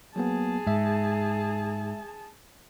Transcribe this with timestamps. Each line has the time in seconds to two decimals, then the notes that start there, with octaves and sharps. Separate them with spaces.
0.16 F#3 A#3 B3 G#4 A5
0.67 G#2 G#3 E5